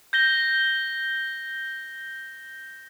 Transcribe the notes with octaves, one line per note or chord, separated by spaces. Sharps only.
G6 A#6 G7